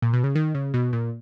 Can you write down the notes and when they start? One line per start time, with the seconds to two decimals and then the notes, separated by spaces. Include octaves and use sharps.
0.02 A#2
0.13 B2
0.24 C#3
0.35 D#3
0.54 C#3
0.74 B2
0.93 A#2